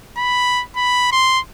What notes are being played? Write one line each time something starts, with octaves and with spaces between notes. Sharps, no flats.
B5
B5
C6